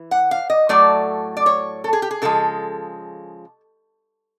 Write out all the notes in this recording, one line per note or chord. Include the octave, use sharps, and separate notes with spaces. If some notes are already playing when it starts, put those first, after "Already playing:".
Already playing: E3
F#5
F5
D#5
A2 F#3 A3 D5
D5
C#5
A4
G#4
G4
G#4
C#3 F3 G#3 A4